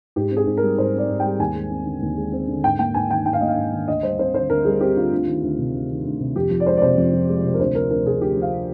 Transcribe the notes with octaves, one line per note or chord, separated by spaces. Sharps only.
G#2 G4
C4
G#4
G#2
A#4
G3
G#2 C5
C4 D5
G#2
G3 G5
D#2 G#5
G#3
C4
D3
D#2
G#3
C4
D3
G#2 G5
A#3 G5
G#2 G#5
D#3 G5
G#2 G5
F5
A#3 D#5
F5
G#2
D#3
D2 D#5
G3 C5
C4 C5
D3 C5
D2 A#4
G3 G#4
C4 G4
D3 F4
D2
D#3
D2
C3
D2
D#3
D2
C3
F2 G4
F3
D5
G#3 C5
D5
C3 C5
F2
F3
G#3
C3
A#4
D2 C5
F3 A#4
D2 A#4
C3 G#4
D2 G4
F3 F5